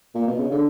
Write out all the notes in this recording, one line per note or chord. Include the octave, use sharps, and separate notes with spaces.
A#2
B2
C#3
D3